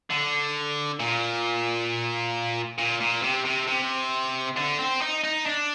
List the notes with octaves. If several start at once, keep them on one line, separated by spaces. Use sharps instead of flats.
D3
A#2
A#2
A#2
C3
C3
C3
D3
C4
D#4
D#4
D4